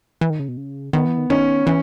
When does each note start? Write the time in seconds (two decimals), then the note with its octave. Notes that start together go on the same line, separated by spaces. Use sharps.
0.21 E3
0.30 D#3
0.39 C#3
0.48 B2
0.57 C#3
0.93 D#3 B3
1.06 E3
1.18 D#3
1.30 D#3 C#4
1.66 E3 C#4